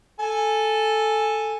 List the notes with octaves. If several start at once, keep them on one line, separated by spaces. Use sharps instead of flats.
A4 G#5